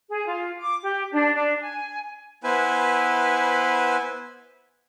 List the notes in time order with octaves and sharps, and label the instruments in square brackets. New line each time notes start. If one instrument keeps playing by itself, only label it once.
[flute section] G#4
F4
D6
G4
D4
D4
G#5
[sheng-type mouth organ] B3 E4 B4 C5 G#5